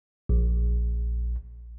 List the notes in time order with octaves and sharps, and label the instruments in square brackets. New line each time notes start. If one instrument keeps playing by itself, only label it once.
[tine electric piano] A#1